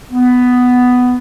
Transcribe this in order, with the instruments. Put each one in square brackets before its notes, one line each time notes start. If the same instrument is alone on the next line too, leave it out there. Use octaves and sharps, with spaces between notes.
[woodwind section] B3